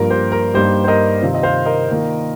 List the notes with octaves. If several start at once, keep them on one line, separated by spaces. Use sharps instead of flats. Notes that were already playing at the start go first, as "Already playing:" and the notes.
Already playing: G2 F3 A#3 F4 A#4
G4 C5
A#4
G2 G3 A#3 D#4 G4 C5
C5
A#4 D#5
C3 D#3 C4 F4
D#5
C5 F5
A#4 D#5
D#3 A#3 F4